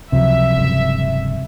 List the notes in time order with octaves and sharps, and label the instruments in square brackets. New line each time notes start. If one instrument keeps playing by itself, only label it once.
[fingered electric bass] C#2 [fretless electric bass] C3 F3 F#3 [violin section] E5
[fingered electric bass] D#1 G2 C#3